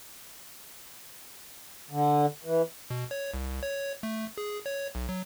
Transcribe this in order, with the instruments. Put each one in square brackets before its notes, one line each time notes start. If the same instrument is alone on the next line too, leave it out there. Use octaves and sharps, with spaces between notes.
[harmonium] D3
E3
[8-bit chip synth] B2
C#5
C2
C#5
A3
G#4
C#5
B1
F#3